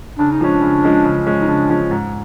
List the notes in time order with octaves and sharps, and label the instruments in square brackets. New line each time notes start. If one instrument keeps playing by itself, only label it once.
[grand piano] C#3 [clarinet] D4
[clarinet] D#4
[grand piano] F3 G#3 C#4 [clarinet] D4
[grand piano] C#3
F3 G#3 C#4
C#3
F3 G#3 C#4
[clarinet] D#4
[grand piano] C#3 [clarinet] D4
[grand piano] F3 G#3 C#4
G#2